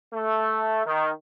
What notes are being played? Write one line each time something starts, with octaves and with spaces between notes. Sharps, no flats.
A3
D#3